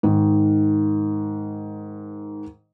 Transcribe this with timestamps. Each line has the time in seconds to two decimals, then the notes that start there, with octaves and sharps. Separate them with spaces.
0.03 G#2 D#3